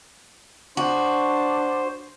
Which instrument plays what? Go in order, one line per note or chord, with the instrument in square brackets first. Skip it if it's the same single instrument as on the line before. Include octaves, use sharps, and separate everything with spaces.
[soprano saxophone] D4 [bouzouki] F#4 [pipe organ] C5